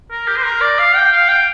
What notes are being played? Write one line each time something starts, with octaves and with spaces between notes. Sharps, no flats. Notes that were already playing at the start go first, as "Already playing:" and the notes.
A#4
G4
C5
A#4
D5
F5
G5
F5
G5